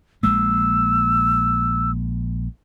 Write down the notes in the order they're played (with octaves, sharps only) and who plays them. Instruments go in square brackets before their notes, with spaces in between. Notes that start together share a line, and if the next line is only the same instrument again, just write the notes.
[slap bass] A#1 G#3 A#3 [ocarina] E6